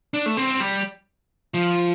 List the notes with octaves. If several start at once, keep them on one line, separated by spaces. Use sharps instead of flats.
D4
A3
C4
G3
F3